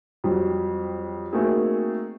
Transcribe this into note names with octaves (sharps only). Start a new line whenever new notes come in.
F2 F#3 G3
A3 A#3 C4 D#4 F#4 G#4